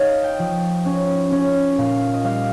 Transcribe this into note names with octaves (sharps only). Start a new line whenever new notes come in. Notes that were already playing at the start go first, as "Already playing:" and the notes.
Already playing: D#4 C#5 D#5 F5
G5
F3
C#4
C#4
A#2 F5
D#5
G3 F5